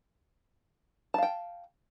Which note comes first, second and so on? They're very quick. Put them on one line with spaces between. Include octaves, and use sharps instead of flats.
A5 F5 G5